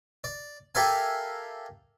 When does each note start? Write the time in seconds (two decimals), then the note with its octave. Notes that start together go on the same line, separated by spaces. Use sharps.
0.24 D5
0.75 G4 A4 A#4 E5 F5 G#5